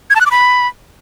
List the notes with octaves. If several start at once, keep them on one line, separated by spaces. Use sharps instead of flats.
G#6
A5
F#6
D6
B5